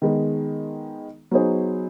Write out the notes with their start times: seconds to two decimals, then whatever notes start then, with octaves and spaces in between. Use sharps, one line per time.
0.02 D#3 G#3 B3
1.31 F#3 B3 D#4 G#4 C5